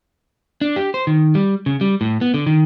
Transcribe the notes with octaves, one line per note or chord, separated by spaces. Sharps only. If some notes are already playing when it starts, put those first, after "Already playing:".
D4
G4
C5
D#3
G3
C#3
G3
A2
B3
D3
D#3